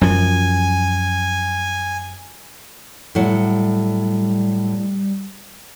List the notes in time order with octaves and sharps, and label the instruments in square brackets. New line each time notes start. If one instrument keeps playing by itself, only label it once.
[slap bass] F#2 F3 [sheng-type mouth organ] G#5
[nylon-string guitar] A2 F#3 F#5 [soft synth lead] G3